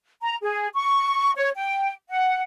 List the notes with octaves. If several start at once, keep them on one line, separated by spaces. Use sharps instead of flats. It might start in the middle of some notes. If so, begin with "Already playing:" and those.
A#5
G#4
C#6
C#5
G5
F#5